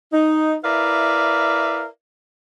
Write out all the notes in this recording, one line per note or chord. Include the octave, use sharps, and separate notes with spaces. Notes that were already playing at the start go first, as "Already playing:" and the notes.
D#4
E4 A#4 B4 D5 E5 F5